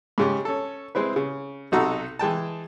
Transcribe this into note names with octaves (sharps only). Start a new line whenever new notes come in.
G#2 C#3 G4
C#4 A4
G#3 C4 E4 B4
C#3
B1 C3 D#4 F#4 A4 A#5
E3 G#3 G5 A5